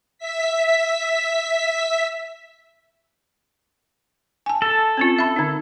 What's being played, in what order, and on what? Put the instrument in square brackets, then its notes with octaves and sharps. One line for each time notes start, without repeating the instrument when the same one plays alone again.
[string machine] E5 B6
[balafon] G#5 A5
[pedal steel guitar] A4
[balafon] C4 C#4 F4
E5 B5
D3 D#4